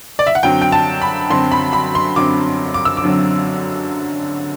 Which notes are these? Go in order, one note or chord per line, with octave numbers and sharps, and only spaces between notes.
D5
E5
F#5
F#2 D3 F#3 C4 G5
G5
A5
B5
F#2 D3 F#3 C4 C6
B5
B5
C6
F#2 D3 F#3 C4 D6
D6
E6
D6
F#2 D3 F#3 C4